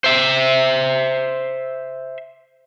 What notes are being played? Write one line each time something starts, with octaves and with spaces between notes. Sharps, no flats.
C5 E5